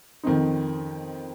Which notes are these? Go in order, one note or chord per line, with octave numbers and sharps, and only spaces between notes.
F2 D#3 C4 D#4